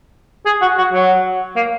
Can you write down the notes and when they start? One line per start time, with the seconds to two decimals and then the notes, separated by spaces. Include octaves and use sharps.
0.46 G#4
0.62 F#4
0.78 F#4
0.93 F#3
1.56 A#3